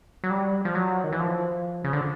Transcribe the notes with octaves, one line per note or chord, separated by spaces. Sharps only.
F#3
G3
F3
F#3
D#3
E3
F3
C#3
D3